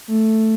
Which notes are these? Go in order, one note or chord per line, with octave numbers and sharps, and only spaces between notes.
A3